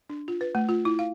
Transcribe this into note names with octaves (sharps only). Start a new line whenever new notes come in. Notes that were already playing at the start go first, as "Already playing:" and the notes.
D4
F4
B4
A3
F4
E4
F5